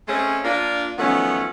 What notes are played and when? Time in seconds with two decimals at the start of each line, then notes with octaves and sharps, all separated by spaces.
0.08 G#3 A3 C4 C#4 G#4
0.45 A#3 D4 F4
0.98 D#3 F3 F#3 A3 B3 C#4